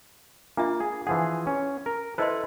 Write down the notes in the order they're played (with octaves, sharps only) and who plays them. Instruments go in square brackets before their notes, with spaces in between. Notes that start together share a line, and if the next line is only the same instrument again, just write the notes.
[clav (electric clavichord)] A#3 [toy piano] D4 F4 E5
[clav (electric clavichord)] G#4
[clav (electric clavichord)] E3 F3 G#4 [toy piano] F#5
[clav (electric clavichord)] C#4
A#4
[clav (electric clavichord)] E4 A4 B4 [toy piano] C5 D#5 C6